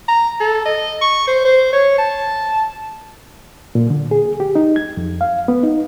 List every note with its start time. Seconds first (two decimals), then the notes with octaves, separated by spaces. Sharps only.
0.08 A#5
0.40 A4
0.66 D#5
1.01 C#6
1.28 C5
1.45 C5
1.73 C#5
1.98 A5
3.75 A#2
3.90 D3
4.11 G#4
4.40 G4
4.55 D#4
4.76 G#6
4.97 F2
5.21 F5
5.48 B3
5.63 D#4